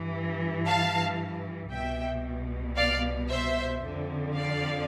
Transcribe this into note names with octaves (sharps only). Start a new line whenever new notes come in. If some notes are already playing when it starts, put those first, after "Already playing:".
Already playing: G2 E3
F5 A5
C2 B2 E5 G5
D5 F5
C5 E5
F2 D3
D5 F5